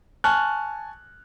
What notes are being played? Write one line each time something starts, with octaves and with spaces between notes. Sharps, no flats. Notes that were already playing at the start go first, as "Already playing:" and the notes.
G#5 A5 C#6 F6 F#6